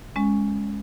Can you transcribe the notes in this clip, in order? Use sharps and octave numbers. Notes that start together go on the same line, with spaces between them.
G#3 C#4